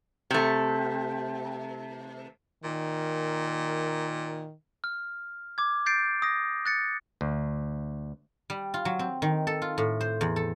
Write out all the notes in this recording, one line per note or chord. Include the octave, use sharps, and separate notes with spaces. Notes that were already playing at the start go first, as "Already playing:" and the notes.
C3 A3
A#2 D#3
F6
D6 G#6
G6 A6 C7 D7
D#6 A#6
F#6 A6 C#7
D2
G3
F4
F#3
C4
D#3
A4
F4
A2
C5
E2
A4